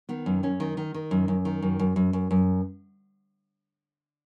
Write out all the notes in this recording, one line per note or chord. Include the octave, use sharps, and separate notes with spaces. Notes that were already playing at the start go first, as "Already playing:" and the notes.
D#3 B3
F#2
F#2 C#4
D#3
D#3
D#3
F#2
F#2
D#3
F#2
F#2
F#2
F#2
F#2